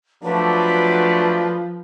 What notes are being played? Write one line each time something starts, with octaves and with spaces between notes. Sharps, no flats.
F3 F#3 A3 D4 B4